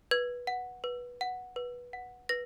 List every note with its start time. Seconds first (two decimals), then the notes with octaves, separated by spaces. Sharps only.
0.11 B4 G#6
0.47 F#5
0.84 B4
1.21 F#5
1.56 B4
1.93 F#5
2.29 B4 A#6